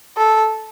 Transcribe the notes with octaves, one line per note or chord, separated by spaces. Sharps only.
A4